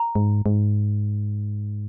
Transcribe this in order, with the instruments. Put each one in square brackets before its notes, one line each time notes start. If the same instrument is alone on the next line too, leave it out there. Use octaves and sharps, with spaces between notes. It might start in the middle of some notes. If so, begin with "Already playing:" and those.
Already playing: [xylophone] A#5
[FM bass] G#2
G#2